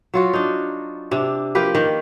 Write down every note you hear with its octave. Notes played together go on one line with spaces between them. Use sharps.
F#3 F4 F#4
D4 D#4
C3 D4
F3 A#3 G4 B4
D#3